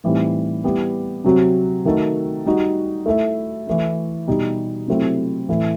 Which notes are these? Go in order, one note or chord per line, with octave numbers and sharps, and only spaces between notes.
A2 E3 G3 C4 D#4
G3 B3 E4 G4
C3 F#3 C4 F#4
D#3 A3 D#4 F#4 A4
G3 D#4 F#4
A3 E4 A4 E5
E3 A3 E4
B2 G3 D#4 G4
C3 F#3 A3 C4 E4
A2 E3 A3 E4